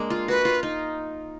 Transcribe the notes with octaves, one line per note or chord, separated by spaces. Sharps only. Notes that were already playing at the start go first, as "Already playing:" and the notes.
Already playing: G#3 A#3 D4
F4
F#4 B4
F4
D#4